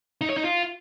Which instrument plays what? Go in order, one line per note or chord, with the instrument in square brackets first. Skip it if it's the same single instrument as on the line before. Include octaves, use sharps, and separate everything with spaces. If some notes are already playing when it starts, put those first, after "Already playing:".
[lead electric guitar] D#4
C#5
D#4
F4